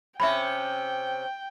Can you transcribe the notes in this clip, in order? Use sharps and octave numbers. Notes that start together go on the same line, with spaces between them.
C3 C#4 E5 G5 B5